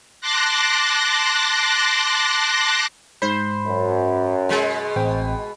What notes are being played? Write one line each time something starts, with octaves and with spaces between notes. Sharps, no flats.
A5 C6 D6 F#6 A#6
G#2 C5 B5
F#2
B2 G#3
A1 C4 G5